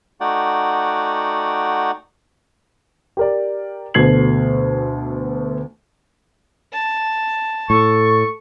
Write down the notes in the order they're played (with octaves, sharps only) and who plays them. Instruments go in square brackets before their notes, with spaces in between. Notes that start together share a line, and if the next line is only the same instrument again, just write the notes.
[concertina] A3 D#4 F#4 D5 F#5 G5
[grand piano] G4 A#4 D5
D2 B2 A3 G#6 C7 F#7
[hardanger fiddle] A5
[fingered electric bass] A2 [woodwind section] A4 C#6